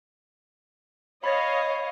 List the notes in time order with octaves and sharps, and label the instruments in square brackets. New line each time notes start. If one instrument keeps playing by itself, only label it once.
[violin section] C#5 D#5 F5 [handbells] B5 A6 A#6